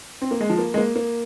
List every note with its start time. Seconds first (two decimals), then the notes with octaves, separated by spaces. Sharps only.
0.21 C4
0.31 A#3
0.40 G#3
0.49 F3
0.58 A#3
0.74 G#3
0.77 A#3
0.95 A#3